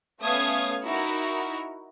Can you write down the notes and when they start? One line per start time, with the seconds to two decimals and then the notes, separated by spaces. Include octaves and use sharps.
0.20 A3 B3 C#4 F5 D#6 G#6
0.84 D#4 E4 F#4 A#4